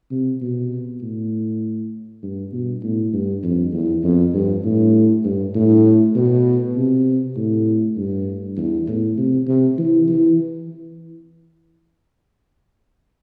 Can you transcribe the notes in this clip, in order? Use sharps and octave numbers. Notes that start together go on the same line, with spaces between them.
C3
B2
A2
G2
B2
A2
G2
F2
E2
F2
G2
A2
G2
A2
B2
C3
A2
G2
E2
A2
C3
C3
E3
E3